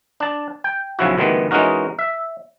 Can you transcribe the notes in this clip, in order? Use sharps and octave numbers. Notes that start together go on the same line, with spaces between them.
D4 A5
G5
B1 C#3 F3 E4 F#4
D2 G2 D#3 E3 B3
E3 G#3 C#4 D#4 F#4 A#4
E5